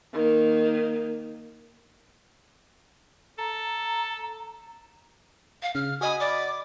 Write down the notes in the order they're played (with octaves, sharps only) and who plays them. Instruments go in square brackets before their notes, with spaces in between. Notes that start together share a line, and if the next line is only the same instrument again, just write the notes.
[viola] D#3 A#3
[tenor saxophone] A4 [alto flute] A#5
[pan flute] F5
[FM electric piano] C#3 [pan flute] F6
[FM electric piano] F#4 D#5 B5 [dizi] G#5 [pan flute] D#6
[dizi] D5 [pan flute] D6